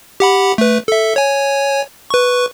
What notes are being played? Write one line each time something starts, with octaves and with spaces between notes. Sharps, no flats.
G4 F#5 B5
A3 B4
A4 E5
C#5 G#5
B4 C#6